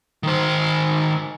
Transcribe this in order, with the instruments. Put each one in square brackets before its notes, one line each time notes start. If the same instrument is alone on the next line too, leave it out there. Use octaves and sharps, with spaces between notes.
[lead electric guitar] D#3 C5